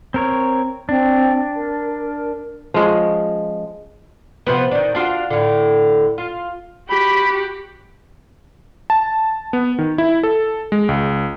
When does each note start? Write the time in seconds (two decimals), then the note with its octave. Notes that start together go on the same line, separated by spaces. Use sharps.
0.14 C4 A#4 C#5
0.89 C4 D4
1.56 A#4
2.74 F3 G#3 C#4
4.47 C3 F3 B3
4.71 D#3 D4
4.95 D4 F4 F#4
5.30 A2 D3
6.18 F4
6.90 F#4 G4 B5
8.90 A5
9.53 B3
9.78 D#3
9.98 E4
10.23 A4
10.72 G#3
10.89 C#2